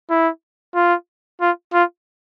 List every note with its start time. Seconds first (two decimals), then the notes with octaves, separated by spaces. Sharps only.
0.10 E4
0.75 F4
1.41 F4
1.73 F4